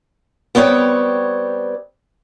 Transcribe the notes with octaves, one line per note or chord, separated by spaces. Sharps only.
G3 B3 C4 C#5 G5